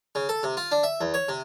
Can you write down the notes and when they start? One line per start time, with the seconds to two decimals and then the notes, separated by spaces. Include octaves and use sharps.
0.15 C#3
0.29 A4
0.43 C3
0.57 F4
0.72 D4
0.83 E5
1.01 E2
1.14 C#5
1.29 C3